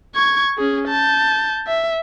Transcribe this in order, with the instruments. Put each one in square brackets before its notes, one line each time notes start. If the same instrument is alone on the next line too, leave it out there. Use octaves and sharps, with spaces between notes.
[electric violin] C#6 G#6
C#4 G#4
A5 G6
E5